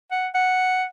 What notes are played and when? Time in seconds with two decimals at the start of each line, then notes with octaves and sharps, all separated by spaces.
0.11 F#5
0.34 F#5